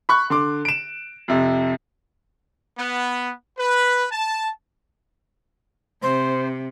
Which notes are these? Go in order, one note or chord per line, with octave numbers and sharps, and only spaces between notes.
B5 C#6 F#6
D3 C6 D6
D7 E7
F2 C3
B3
B4
A5
C3 C5